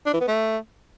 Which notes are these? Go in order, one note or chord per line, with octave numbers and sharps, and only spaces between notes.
D4
E3
B3
A3